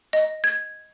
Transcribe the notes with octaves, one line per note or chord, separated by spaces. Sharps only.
D#5
G#6